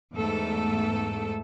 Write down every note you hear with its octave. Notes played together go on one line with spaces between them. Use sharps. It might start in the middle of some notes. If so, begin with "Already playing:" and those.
E2 G#2 A3 A4